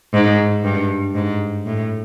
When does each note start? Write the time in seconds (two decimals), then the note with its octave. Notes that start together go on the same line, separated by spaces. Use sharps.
0.14 G#2
0.64 G2
1.14 G#2
1.66 A2